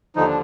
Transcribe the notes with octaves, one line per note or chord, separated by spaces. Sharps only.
D#2 D3 F3 D#4
D4